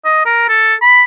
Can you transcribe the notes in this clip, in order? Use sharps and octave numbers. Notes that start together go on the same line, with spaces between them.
D#5
A#4
A4
B5